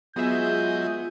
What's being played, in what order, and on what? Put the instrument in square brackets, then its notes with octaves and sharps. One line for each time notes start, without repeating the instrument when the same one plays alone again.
[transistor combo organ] F#3 G#3 D#5 [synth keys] B3 G#4 E5 [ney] F4 [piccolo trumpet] G6